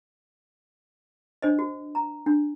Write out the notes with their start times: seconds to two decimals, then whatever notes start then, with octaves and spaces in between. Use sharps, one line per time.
1.42 D4 C5 D#5
1.59 F#4
1.95 A#5
2.26 D4